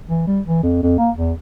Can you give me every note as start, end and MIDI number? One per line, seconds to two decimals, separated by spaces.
0.10 0.26 52
0.27 0.40 55
0.46 0.63 52
0.63 0.81 41
0.83 0.98 41
0.98 1.11 58
1.17 1.32 40